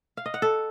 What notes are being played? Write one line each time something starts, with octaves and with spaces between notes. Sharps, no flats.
F5
D#5
F#5
A4